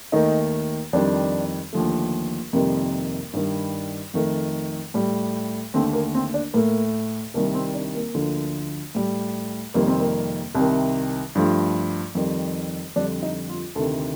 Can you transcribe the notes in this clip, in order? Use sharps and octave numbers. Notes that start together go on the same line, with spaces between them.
D#2 D#3 A3 D#4
F2 D#3 G3 D4
D#2 D3 F3 A3
F2 C3 D#3 G3 A#3
G2 D#3 G3
F2 D#3 A3
A2 G3
D#2 D3 A3 C4
A#3
C4
D4
A2 A3 A#3
C2 C3 D#3 G3 A#3
C4
D4
A#3
D2 D3 F3
A2 G3
F2 C3 D#3 G3 A#3
C4
A#3
C2 C3 D#3
G2 F3 A3
F2 D#3 G3
F2 D3 G3 D4
D#4
F4
D2 C3 D#3 A4